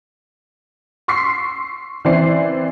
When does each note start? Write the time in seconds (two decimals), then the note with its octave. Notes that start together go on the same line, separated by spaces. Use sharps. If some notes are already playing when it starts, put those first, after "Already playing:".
1.08 C6 C#6 E6 B6 C7
2.05 E3 C4 E4 C5 D5 C7